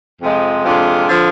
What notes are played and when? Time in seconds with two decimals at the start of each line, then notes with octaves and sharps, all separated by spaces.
0.21 F2 C3 F3 G#3
0.65 F2 C3 G#3 D4 F4
1.08 D3 F3